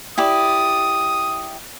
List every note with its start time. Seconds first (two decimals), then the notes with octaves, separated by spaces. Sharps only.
0.18 E4 G4 D5 D#6